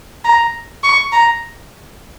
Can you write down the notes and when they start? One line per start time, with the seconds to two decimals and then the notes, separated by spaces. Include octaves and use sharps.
0.24 A#5
0.84 C#6
1.12 A#5